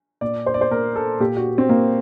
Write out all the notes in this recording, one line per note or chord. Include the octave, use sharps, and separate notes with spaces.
A#2 D5
C5
D5
C5
A#2 A#4
A4
A#2 G4
F#4
C4
A#2 A#3